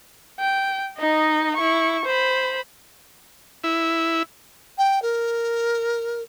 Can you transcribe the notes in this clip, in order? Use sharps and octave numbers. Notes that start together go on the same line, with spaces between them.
G5
D#4 D#5
E4 C#6
C5 B5
E4
G5
A#4